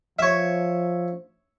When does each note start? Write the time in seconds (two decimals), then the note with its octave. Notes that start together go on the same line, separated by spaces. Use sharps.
0.19 F3 C#5 E5